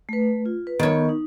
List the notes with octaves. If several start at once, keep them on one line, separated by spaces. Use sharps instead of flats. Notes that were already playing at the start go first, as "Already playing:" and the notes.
A3 B4
F4
B4
D#3 B3 C#5
D#4